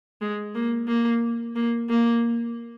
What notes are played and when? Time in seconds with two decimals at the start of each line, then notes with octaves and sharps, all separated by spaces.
0.21 G#3
0.55 A#3
0.87 A#3
1.55 A#3
1.89 A#3